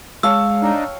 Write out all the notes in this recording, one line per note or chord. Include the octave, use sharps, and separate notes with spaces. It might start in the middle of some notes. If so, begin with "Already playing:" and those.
G#3 C#5 F5 A5 E6
D4 D#4 G5